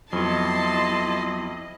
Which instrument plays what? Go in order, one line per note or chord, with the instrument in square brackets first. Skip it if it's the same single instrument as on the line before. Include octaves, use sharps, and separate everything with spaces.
[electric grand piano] F2 [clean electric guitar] F#3 B3 [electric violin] E4 D#5 [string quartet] A5 C6